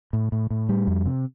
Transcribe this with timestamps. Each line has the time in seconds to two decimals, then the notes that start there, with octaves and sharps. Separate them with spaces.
0.13 A2
0.32 A2
0.50 A2
0.69 G3
0.87 F2
1.06 C3